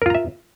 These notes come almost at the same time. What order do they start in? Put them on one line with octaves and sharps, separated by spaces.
A#4 F4 A#5 E5